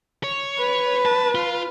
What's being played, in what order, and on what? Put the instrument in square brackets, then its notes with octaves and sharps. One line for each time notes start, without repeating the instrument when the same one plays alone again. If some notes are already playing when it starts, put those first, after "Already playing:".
[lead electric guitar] C#5
[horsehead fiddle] B4
[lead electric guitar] A5
F4